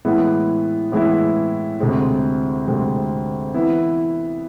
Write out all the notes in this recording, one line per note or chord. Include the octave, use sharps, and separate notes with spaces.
A2 E3 G#3 B3 E4
A2 E3 G#3 B3 E4
D2 C3 G#3 C4
D2 C3 G#3 C4
E3 B3 E4